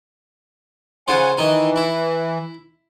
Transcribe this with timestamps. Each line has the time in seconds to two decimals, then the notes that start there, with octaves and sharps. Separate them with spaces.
1.08 C#3 F4 C5 F#5 G#5
1.38 D#3 E3 D#4 G#5
1.76 E4